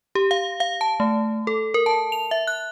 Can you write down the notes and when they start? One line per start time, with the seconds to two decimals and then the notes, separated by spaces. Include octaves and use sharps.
0.15 G4
0.31 F5
0.60 F5
0.81 A5
1.00 A3
1.47 A4
1.74 A#4
1.86 A5
2.12 F7
2.31 E5
2.47 F#6